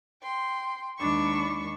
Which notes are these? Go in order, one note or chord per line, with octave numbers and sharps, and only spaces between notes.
G5 C6
D#2 D#3 G#3 D4 B5 C#6